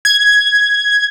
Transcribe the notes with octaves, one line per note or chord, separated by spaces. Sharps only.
G#6